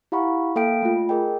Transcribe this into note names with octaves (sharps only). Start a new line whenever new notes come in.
E4 G4 F5 F#5 B5 C#6
A#3 A4 F5 G5 D7
A3 F4
G#4 A#4 D#5 G5